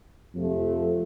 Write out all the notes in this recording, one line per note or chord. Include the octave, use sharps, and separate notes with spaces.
F2 C3 F3 A3